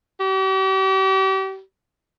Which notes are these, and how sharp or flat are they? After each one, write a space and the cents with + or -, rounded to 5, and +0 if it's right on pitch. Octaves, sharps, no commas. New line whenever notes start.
G4 -40